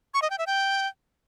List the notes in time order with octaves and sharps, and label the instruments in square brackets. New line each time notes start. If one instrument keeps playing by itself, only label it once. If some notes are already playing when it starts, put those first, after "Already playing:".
[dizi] C#6
D#5
G5
E5
G5